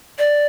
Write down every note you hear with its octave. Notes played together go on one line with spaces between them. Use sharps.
D5